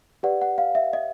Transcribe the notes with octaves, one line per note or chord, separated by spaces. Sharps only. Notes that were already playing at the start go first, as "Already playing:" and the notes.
G4 B4 D5 F#5
F#5
F5
E5
D#5